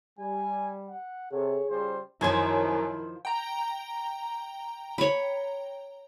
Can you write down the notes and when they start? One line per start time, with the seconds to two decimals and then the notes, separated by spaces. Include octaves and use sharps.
0.19 G3 G#5
0.89 F#5
1.32 C3 G#4 A4 C#5
1.70 C#3 G3 F4 C5
2.21 F#2 D#3 F3 E4 C5 C#5 G#6
3.25 G5 A#5
4.98 C#5 B5